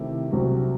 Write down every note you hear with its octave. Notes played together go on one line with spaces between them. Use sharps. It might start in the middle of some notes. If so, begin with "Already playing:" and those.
Already playing: C3 D#3 A3 E4 G4
C2 C3 F#3 C4 F#4